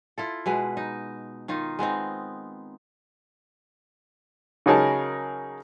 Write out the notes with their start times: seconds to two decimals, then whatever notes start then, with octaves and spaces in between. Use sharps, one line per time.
0.18 E4 F4 A4
0.46 B2 G#3 B4
0.77 D#4
1.48 D#3 D#4 F4
1.79 G#3 B3 C4 D#4
4.66 C#3 F#3 D#4 G#4 A#4 A5